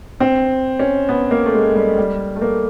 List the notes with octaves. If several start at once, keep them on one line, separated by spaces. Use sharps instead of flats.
C4
C#4
B3
A#3
A3
G#3
G3
G3
A3
A#3